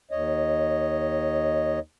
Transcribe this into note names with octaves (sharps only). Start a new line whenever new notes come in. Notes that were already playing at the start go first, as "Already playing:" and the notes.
D#2 C#5 D#5